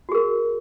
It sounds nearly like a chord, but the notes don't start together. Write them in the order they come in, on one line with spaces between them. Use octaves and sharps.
F#4 G#4 A#4